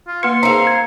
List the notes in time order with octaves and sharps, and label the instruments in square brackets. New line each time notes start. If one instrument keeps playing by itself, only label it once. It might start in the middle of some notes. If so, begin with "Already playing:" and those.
[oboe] F4
[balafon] A#3 B4 [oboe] C6 [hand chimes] C#7
[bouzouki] A#3 C4 [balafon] D#4 G#4 [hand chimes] A#5 C#7
[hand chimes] G#6